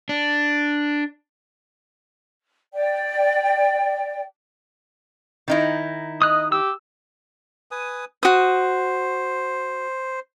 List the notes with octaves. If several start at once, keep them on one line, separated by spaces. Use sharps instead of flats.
D4
D5 G5
D#3 D#4 E4
D#5 D#6 F#6
G4 E6
B4 G#5 D#6
F#4 C5 D#6